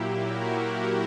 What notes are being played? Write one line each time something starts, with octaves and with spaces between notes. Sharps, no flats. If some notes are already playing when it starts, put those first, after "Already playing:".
Already playing: A#2 F#3 A#3 E4 G4
F#4 A#4